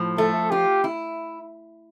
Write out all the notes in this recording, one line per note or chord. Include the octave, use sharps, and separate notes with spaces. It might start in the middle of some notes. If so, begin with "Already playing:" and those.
Already playing: A2 F3
A3 A4
F4 G4
E4